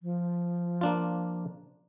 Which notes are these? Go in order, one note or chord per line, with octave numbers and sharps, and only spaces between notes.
F3
A#3 D4 F4